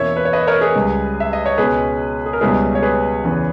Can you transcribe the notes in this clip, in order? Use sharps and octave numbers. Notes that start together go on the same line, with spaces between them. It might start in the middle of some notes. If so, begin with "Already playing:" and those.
Already playing: E2 B2 A#3 C#4 E4 C#5 E5
B4
C#5
B4 D#5
A#4 C#5
G#4 B4
C#2 C#3 G3
E5
D#5
C#5
C#2 B2 G#3 C#4 G#4 B4
G#4
A#4
C#2 B2 G3 C#4 E4 G#4 B4
C#5
G#4 B4
E2 C#3 E3